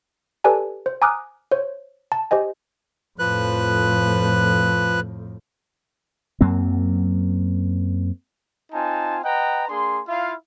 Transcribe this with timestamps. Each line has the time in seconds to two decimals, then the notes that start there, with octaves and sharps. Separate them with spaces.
0.44 G4 A4 B4 D5 G#5 A5
0.86 C5
1.02 G#5 A#5 D6 D#6 F6 F#6
1.52 C5 C#5
2.12 A5
2.31 G4 C5 D#5 G#5
3.19 F2 A2 F3 B4 F#6
6.41 F#2 F#3 A#3 C4
8.72 C4 D#4 F4 G#5 A5
9.24 B4 D#5 F#5 G5 A#5
9.68 A#3 D4 G#4 C6
10.07 E4 F4 F5